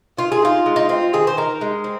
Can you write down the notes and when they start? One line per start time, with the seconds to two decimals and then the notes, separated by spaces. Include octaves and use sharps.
0.17 D#3 F4
0.32 G#4
0.42 D#4 F4
0.66 G#3
0.76 D#4
0.89 C4 F4
1.13 D#3 G#4
1.27 C5
1.37 D#4 A#4
1.61 G#3
1.84 C4